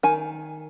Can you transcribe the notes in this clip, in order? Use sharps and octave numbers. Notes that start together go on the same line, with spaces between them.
D#3 G#5